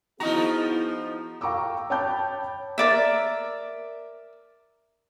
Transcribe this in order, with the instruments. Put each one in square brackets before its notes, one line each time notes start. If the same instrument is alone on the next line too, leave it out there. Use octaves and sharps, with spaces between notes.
[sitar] F3 D#4 F#4 [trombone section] B3 G#4 [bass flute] E4 [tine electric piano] A#5
[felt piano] F5 G5 A#5 C#6 D6 E6
C#5 G5 A5 B5 D6 G6
[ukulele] A#4 D5 E5